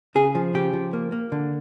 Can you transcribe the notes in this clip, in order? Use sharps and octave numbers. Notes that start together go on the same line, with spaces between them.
C#3 G#4
F3
C#3 G4
F3
A#3
A#3
D3